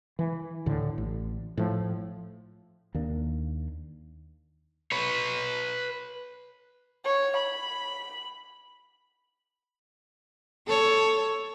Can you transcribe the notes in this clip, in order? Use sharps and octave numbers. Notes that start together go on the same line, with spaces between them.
E3
D2 A2 D3
A1
A2 F3
D#2 A#3 D4
B4 C#5
C#5
B5
A4 C#5